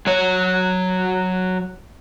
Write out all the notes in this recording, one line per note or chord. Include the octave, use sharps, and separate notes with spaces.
F#3 C#5